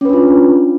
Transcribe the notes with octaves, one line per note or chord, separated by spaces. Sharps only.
C#4 D4 F4 B4